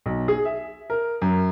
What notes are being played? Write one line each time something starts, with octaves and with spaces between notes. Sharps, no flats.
B1
G#4
E5
A#4
F#2